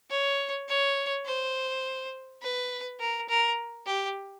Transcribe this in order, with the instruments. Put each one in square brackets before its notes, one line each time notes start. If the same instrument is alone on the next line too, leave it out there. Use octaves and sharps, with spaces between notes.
[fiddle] C#5
C#5
C5
B4
A#4
A#4
G4